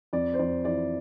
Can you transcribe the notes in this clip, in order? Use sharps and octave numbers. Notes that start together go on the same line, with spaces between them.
F2 D5
C5
F2 D5
E3 D5